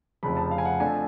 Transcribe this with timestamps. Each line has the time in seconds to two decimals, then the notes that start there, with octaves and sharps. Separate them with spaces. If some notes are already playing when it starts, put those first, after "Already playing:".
0.23 F1 F2 C#3 F3 B5
0.37 A5
0.51 F5
0.58 G#5
0.65 F#5
0.80 F2 F3 A3 D4 G#5